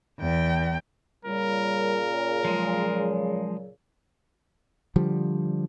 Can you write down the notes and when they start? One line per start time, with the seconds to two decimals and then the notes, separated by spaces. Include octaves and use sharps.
0.19 E2 G5
1.25 A#2 C#3 G3 A#4
2.45 F3 F#3 G#3
4.96 D3 F3 G3